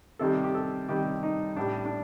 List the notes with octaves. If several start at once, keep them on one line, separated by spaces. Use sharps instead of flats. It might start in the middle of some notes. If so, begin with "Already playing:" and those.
C3 D#3 G3 A4
G4
A4
C3 D#3 G3 G4
D#4
A2 G3 D4
D4